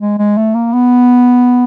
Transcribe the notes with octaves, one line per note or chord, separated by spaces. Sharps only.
G#3
G#3
A3
A#3
B3